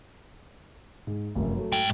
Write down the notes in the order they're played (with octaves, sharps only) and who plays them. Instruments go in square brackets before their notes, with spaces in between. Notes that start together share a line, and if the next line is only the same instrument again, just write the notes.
[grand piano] G#2
F1 F#2
F#3 A3
[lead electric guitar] G#2 G5